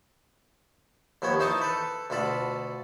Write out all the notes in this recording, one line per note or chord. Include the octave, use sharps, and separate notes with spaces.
D#2 F3 B3 C#5
E3 D#4 C5 D#5 A5 C#6
A4 B4
D2 B2 F4 A4 B5